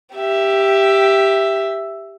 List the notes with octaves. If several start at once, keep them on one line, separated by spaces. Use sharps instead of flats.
G4 E5